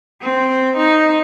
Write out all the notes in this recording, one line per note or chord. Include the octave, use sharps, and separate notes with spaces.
C4
D#4